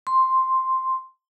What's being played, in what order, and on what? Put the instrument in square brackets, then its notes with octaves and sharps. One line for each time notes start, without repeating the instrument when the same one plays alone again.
[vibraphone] C6